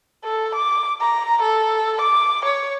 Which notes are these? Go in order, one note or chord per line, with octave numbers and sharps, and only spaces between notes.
A4
D6
A#5
A4
D6
C#5